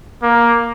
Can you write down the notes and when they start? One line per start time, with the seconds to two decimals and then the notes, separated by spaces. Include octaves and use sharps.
0.22 A#3